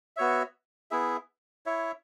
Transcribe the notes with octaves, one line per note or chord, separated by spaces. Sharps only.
B3 F#4 C#5 E5
B3 E4 G#4 E5
E4 C#5 E5